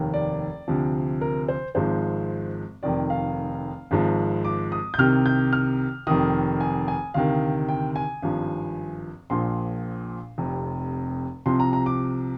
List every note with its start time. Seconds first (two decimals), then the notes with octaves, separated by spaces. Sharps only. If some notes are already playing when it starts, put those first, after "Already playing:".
Already playing: F1 D#2 D#3
0.14 D5
0.68 D2 C3 F3
1.21 A#4
1.48 C5
1.75 G#1 G#2 F3 C5
2.83 F1 F2 D#3 D5
3.10 F5
3.91 G#1 G#2 F3
4.45 D6
4.72 D#6
4.94 G6
4.98 C2 C3 D#3 F6
5.26 G6
5.53 F6
6.07 F1 F2 D#3 D#6
6.61 G#5
6.88 G#5
7.14 D2 C3 D#3 F5
7.69 G5
7.96 G#5
8.22 G#1 G2 F3
9.30 A#1 A#2 F3 C6
10.38 F1 F2 C3
11.46 C2 C3 F3 C6
11.60 A#5
11.73 A#5
11.86 D6